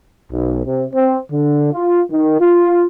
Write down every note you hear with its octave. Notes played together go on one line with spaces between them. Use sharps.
B1
C3
C4
D3
F4
D#3
F4